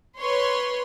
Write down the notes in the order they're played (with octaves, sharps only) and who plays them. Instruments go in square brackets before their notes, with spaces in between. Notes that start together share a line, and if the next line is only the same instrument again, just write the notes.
[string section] B4 C#5 C6